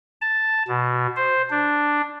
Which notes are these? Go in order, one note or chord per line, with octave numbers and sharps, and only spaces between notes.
A5
B2
C5
D4